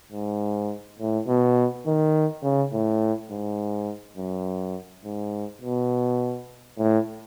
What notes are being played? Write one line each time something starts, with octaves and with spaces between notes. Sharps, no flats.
G#2
A2
B2
D#3
C#3
A2
G#2
F#2
G#2
B2
A2